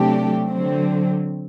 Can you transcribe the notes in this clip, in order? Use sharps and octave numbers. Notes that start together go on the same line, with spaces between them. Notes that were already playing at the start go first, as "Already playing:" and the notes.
Already playing: C3 F#3 A3 D4 G4
D3 F#3 C4